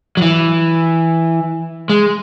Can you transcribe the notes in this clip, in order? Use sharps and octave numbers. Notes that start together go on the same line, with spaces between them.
F#3
E3
G#3